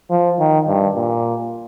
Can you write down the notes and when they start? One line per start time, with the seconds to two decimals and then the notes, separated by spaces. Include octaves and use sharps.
0.11 F3
0.39 D#3
0.67 G2
0.96 A#2